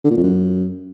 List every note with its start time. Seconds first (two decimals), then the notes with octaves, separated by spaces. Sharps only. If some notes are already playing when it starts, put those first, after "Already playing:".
0.04 D3
0.11 A#2
0.17 F2
0.23 F#2